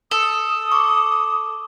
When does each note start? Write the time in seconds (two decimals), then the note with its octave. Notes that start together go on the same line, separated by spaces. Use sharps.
0.11 A4 D#6
0.72 C#6 D6